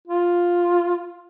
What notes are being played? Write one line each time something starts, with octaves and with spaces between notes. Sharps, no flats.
F4